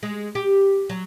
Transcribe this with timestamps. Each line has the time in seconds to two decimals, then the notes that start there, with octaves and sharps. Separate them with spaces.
0.03 G#3
0.35 G4
0.89 F#3